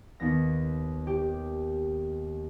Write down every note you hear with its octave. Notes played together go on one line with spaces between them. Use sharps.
D#2 B3 A#6
G4